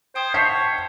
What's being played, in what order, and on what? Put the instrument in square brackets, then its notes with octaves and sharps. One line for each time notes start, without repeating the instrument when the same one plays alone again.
[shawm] C5 [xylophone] G5 D#6 G#6
[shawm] C#5 [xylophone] F#5 A5 [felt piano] G6 B6 C7